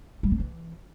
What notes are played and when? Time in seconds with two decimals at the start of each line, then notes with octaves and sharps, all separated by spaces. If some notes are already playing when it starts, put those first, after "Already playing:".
0.23 G3
0.31 C4
0.39 E3